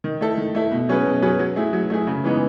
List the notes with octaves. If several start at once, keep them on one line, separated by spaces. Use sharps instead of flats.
D#3
A3 E4 A4
D#3
A3 E4 A4
B2
F#3 C#4 G#4 B4
B2
F#3 C#4 G#4 B4
F#3
A3 E4 G#4
F#3
A3 E4 G#4
C#3
E3 G#3 B3 D#4